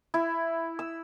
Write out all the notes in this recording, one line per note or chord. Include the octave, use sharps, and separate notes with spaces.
E4
E6